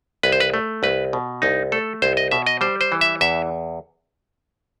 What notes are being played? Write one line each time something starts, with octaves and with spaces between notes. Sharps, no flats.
C2 B4
C5
B4
A3
C2 B4
B2
C2 D#4
A3 A4
C2 C5
D#5
B2 E5
D#5
G3 C5
C5
E3
E5
E2 E5